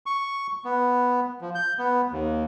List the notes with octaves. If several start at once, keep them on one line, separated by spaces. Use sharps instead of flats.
C#6
B3
F3
G6
B3
D#2